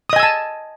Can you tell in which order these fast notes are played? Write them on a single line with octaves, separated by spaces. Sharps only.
D#6 D#5 G#5 E6 A5